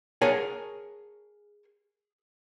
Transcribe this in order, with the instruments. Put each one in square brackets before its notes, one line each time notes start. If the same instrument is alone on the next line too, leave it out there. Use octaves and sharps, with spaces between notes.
[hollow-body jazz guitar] G#4 A#4 C#5 F#5 G#5 A5